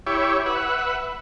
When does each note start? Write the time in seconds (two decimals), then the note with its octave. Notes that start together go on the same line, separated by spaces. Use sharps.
0.07 E4 G4 C#5
0.46 B4 E5 F#5